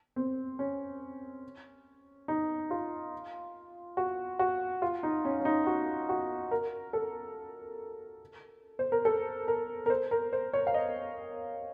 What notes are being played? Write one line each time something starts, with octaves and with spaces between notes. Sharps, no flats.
C4
C#4
D#4
F4
F#4
F#4
F4
D#4
C#4
C#4
D#4
F#4
F#4
A#4
A4
C5
A#4
A4
A#4
A#4
C5
A#4
C5
C#5
F5
D#5